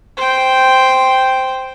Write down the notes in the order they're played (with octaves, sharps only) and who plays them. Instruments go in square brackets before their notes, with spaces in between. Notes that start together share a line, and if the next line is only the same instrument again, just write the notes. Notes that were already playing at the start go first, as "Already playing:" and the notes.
[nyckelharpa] C5 G5